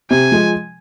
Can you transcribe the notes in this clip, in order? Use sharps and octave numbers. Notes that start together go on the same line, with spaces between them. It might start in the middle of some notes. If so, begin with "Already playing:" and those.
C3 G#5
F3 G#3